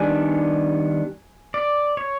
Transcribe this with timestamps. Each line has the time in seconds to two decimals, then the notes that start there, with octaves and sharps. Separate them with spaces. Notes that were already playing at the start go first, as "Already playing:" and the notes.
Already playing: D#3 G3 B3 D4 G#5
1.54 D5
1.97 C#5